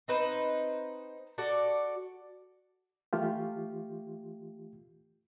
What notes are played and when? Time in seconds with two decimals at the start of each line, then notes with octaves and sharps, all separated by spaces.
0.08 C4 D#4 B4 C5
1.38 F#4 A4 D5
3.13 E3 A3 F4 G4